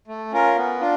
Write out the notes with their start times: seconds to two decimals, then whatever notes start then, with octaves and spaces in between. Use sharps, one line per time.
0.07 A3
0.32 C#4 F4 A#4
0.57 B3
0.81 D4 F4